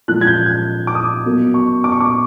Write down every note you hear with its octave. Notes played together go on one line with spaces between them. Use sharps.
A#2 F3 G#3 F#6
G#6
G6
G#6
D6
D#6
B2 F#3 A#3
C#6
D6
C#6
D6